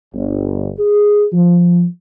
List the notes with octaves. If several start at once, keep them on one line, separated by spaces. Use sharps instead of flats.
G1
G#4
F3